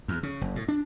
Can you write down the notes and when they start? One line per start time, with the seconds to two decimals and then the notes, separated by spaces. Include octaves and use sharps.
0.08 E2
0.23 C#3
0.41 F#1
0.56 A2
0.68 D4